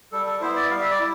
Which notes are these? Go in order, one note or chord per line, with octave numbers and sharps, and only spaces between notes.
G3 A4
A4
B3 E4 C5
D5
G3 F5
E5
D5
E4